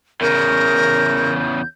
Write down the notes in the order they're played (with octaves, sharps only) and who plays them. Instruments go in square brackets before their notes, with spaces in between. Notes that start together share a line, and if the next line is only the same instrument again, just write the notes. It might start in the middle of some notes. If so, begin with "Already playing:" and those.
[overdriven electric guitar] E2 C#3 [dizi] A#4 [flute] G6